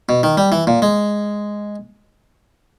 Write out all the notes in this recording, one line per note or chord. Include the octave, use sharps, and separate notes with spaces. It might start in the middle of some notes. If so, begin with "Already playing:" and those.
B2
D#3
G3
E3
A#2
G#3